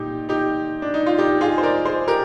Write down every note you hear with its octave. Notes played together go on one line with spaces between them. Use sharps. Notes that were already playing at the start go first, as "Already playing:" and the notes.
Already playing: A#2 D#4 G4
D#4 G4
D4
D#4
F4
D#4 G4
F4 G#4
C5
A#4 D5
G#4 C5
G4 A#4